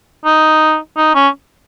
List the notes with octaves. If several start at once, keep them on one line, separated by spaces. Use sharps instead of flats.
D#4
D#4
C#4